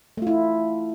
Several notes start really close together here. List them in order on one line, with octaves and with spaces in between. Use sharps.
A3 F4 E4